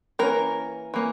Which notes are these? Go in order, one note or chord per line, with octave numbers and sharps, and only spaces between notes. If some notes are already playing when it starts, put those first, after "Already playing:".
E3 A#3 C#4 A#4
E3 A#3 C#4